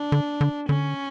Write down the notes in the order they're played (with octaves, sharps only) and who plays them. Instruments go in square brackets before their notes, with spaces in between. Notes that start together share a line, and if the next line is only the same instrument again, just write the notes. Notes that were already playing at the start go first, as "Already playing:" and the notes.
Already playing: [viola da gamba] D4
[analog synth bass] D3
D3
[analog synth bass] D3 [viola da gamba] C#4